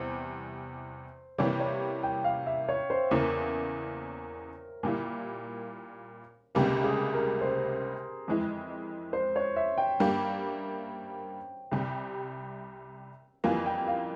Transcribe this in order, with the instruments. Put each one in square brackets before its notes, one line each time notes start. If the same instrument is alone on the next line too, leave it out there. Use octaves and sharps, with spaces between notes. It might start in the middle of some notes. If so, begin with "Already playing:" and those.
Already playing: [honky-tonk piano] E2 C3 G3 [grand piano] C5
[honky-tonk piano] C3 E3 G3 A#3 E4 [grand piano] C#5
[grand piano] C#5
G5
F5
E5
C#5
C5
[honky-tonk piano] E2 C#3 E3 A#3 E4 [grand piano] A#4
[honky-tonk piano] A#2 G3 A#3 E4
[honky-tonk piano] C#2 C3 G3 A#3 [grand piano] G4
[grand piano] G#4
A#4
C5
[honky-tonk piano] F2 E3 G#3 E4
[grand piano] C5
C#5
E5
G5
[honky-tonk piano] G2 G3 A#3 [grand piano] G5
[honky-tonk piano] C2 C3 G3
[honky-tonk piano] F2 E3 G3 A#3 F4 [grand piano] G#5
[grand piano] G5
F5